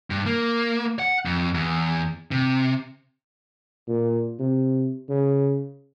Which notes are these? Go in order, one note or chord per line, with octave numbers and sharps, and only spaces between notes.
G2
A#3
F#5
F2
E2
C3
A#2
C3
C#3